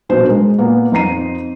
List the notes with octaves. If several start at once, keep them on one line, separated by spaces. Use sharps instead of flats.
A#1 B2 D4 C5
G#3 A#4
A#2 A#3 B3
F2 D#4 A#5 C7 D#7